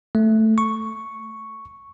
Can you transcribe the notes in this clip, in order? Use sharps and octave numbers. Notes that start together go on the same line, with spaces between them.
A3
C#6